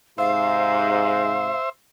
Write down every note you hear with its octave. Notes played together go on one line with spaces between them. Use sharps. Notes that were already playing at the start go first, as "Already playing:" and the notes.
G#2 C3 C5 E5 F5